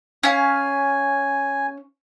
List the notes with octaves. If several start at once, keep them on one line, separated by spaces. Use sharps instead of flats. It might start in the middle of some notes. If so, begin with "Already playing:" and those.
C#4 F5 G#5